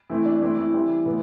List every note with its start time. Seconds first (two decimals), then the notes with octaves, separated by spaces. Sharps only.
0.10 E3 A3 C4 E4
0.26 D4
0.42 E3 A3 C4 E4
0.57 E4
0.74 E3 G3 C4
1.06 A2 E3 B3